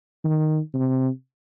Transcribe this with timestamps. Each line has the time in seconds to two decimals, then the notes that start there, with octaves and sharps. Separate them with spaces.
0.25 D#3
0.74 C3